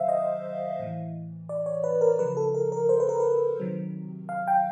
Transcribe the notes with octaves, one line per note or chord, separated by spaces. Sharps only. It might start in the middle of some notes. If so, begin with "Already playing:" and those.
Already playing: C3 D#3 F#3 C5 E5 F5
D#5
A2 E3
D5
C#5
B4
A#4
C#3 F3 B4
A4
A#4
A#4
C5
B4
A#4
B4
C3 D#3 F#3
F5
G5